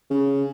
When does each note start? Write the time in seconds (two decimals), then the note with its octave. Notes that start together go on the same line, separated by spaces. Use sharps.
0.11 C#3